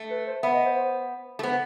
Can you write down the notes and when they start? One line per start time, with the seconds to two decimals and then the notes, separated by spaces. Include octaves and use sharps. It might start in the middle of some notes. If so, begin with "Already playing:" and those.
Already playing: A3
0.10 B4
0.27 C5
0.43 B3 E5
0.54 D#5
0.65 C5
0.76 C5
1.39 A3
1.43 B3 C5